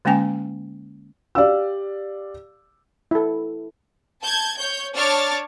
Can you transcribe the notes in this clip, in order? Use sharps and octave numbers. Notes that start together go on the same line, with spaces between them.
D3 G#3 A#3 C#4 G5 G#5
G4 D5 F5 E6
E4 A4
A5 G6 G#6
C#5 G6
D4 C#5 A5 D6 F6 A6